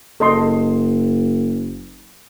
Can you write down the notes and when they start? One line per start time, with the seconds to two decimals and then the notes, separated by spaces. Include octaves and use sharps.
0.20 F#1 A4 D#5 C6